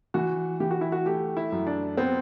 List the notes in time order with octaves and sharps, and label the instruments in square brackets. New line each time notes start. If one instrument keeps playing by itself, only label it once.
[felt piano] E3 [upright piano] F#4
[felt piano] E3 [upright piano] G4
[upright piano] F#4
E4
F#4
[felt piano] A3 [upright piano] G4
[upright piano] E4
[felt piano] F#2
[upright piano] D4
[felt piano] B3 [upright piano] C4